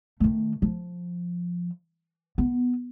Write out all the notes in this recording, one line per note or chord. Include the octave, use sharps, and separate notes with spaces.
D#3 A3
F3
B3